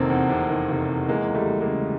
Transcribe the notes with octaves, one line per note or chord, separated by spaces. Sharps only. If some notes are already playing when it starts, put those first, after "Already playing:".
Already playing: F1 C3 D#3 A#3 C4
E2
C3
D#3
F1
E2
E3 G#3 A#3
C#2
G3 A3
C#2
G#3 A#3
C#3